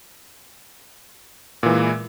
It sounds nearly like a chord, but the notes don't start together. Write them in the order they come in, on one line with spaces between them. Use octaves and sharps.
A#2 E3 G#3